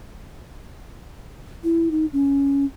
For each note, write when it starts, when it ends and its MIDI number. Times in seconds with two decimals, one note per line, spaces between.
1.64 1.89 64
1.91 2.06 63
2.13 2.65 61